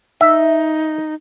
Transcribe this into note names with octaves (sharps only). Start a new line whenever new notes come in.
D#4 E5